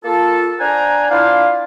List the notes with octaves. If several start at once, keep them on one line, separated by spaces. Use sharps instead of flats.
A#3 F4 A4
D4 C5 F#5 G#5 A#5
D4 E4 F4 F5